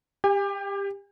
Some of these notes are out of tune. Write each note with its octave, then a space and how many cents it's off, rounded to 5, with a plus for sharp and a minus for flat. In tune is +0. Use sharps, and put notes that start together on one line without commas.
G4 +20 G#5 -45